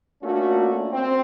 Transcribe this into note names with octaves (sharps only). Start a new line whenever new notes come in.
A3 A#3 C#4 D4 F4 F#4
C4